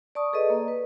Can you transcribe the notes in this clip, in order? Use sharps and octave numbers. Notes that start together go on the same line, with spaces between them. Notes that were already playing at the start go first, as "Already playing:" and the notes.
D5 A5 C#6 D#6
G#4 A4 B4 D5 D#5
A#3
B4